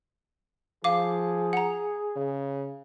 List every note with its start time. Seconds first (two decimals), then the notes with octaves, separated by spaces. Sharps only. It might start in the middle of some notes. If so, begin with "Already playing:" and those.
0.84 F3 G#4 F5 D6
1.53 F#5 A#5
2.16 C#3